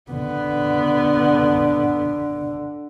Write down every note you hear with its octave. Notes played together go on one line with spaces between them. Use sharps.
D3 B3